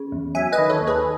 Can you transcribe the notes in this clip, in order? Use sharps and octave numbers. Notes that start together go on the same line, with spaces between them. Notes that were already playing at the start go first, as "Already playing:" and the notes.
Already playing: C#3
E2
F#3 E5 G#5
B4 D#5
D#3
A4 C#5
D#2
G#4 B4